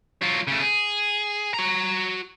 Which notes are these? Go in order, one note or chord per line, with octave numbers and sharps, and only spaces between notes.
F#3 F4
C#3 A3
G#4
F#4 A#5